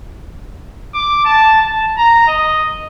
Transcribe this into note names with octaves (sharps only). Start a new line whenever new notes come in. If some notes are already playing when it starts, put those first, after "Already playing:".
D6
A5
A5
A#5
D#5